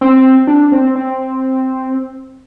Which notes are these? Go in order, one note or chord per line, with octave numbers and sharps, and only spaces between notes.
C4
D4
C4
C4